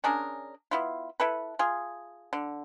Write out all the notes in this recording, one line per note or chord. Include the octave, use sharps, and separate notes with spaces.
C#4 D4 G#4 A#4
B3 E4 F4
E4 A4 B4
F4 G#4
D3